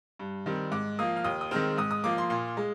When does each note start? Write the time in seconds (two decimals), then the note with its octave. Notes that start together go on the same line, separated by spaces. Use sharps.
0.19 G2
0.46 D#3 G3 C4
0.72 G#2 D6
0.99 F3 A#3 D#6
1.16 F6
1.24 D#2 D#6
1.41 D#6
1.51 D#3 G#3 C4 F6
1.78 G#2 D#6
1.91 D#6
2.04 F3 A#3 D6
2.18 C6
2.30 A#2 C6
2.57 G#3